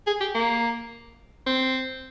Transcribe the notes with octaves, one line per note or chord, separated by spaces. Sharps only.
G#4
G4
A#3
C4